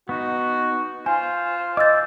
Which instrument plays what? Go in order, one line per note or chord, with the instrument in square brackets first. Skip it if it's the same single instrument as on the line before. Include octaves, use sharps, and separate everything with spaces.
[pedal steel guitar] B3 D#4 [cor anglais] F#4
[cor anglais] F4 [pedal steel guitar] C5 [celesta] G#5
[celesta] D#5 A6 [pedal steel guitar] D6 E6 G6